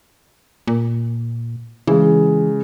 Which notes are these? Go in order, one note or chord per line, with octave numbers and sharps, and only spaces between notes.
A#2
C#3 E3 G#3